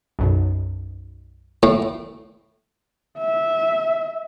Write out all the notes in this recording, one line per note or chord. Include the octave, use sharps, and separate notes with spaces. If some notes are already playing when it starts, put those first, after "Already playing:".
B1 F#2 B2
A2
E5